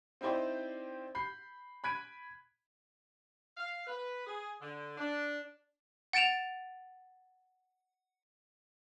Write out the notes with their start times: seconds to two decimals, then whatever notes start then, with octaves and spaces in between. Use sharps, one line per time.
0.21 C4 D#4 E4 G4 C5 D5
1.15 B5 G6 C7
1.84 B5 F#6 G#6 B6 D7 D#7
3.57 F5
3.87 B4
4.26 G#4
4.61 D3
4.97 D4
6.13 F#5 A6 D7 E7 F7